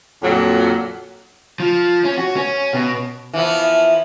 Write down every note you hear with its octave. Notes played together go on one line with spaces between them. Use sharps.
F2 A#2 D3 F#3
F3
C#4
F#4
C#4
B2
E3 F3 B3